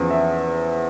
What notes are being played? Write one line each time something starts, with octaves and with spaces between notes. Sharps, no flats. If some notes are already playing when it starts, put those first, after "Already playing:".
Already playing: E2 C#3 F3
E5